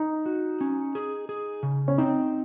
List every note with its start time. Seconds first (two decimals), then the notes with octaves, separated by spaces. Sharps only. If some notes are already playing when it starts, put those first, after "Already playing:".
Already playing: D#4
0.26 F#4
0.61 C#4
0.95 G#4
1.29 G#4
1.63 C#3
1.88 C#4
1.98 C4 D#4